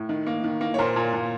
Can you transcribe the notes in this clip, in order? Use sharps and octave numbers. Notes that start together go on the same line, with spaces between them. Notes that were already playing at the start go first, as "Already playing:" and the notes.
Already playing: A2
D#3
A#3
D#3
A#3
C#5
A#2 A#4 C5
A#2
A#2